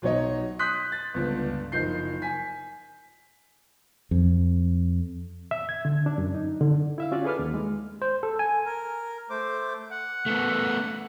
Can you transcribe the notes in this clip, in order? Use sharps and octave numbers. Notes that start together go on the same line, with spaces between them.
B1 F#3 D#4 C#5 D#5
C6 D#6 F#6 G6 B6
A6
G1 C#2 D4
F#1 F3 D#4 G6 C7
G#5 B6
F2
E5
G#6
D3
D4
F#2
D#4
D3
E4 E5 F5
C#4 F4 F#4 D5
G#4 A4 B4 D6 F6
D#2
G#3
C5
A4
G#5
A#4
A3 C5 D6
F#5
A3 B3